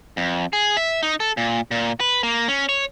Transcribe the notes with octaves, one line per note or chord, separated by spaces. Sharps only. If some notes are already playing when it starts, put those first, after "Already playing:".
F2
G#4
E5
D#4
A4
A#2
A#2
B4
A#3
C#4
C#5